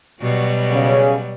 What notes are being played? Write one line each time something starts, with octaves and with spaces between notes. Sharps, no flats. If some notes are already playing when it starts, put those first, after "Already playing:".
B2 F#3 G3
C#3